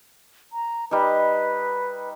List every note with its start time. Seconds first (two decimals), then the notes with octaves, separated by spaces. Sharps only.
0.52 A#5
0.91 G3 D#4 B4